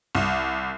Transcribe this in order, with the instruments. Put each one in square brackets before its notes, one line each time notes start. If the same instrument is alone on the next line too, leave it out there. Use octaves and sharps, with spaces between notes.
[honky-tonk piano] C2